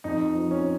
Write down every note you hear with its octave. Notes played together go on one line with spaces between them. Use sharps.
F2 D#4
F3
C#4